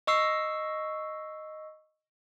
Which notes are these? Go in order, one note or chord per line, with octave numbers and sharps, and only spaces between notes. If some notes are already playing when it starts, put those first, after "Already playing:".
D#5 C#6 E6 C7